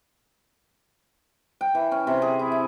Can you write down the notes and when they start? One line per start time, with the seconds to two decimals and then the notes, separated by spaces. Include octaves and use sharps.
1.61 G5
1.75 E3
1.92 C#4
2.07 C3
2.22 G#4
2.39 E4
2.52 E4